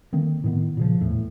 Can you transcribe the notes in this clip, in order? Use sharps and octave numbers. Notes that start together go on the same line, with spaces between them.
D3 D#3 A#3 C4
A2 D#3 B3
A#2 C#3 F3
D#1 E2 A2